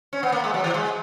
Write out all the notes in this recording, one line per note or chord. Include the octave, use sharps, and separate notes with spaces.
C#4
B3
A#3
G#3
F#3
E3
G#3